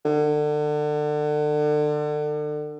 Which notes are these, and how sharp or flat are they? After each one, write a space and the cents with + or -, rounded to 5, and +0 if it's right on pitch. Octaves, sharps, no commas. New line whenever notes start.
D3 +30